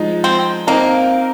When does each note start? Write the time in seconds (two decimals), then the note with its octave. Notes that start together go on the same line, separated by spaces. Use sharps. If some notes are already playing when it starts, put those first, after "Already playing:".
Already playing: F3 G#3 D#4
0.24 C4
0.67 A#3 C4 D#4 A#4